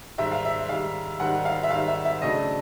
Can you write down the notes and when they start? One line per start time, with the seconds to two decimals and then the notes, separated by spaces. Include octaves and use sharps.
0.18 G#2 D#3 G3 E5
0.32 F5
0.45 E5
0.69 G#2 D#3 G3 F5
1.20 G#2 D#3 G3 F#5
1.45 F5
1.63 E5
1.70 G#2 D#3 G3 F5
1.88 E5
2.05 E5
2.22 C#3 F#3 A3 D4 D#5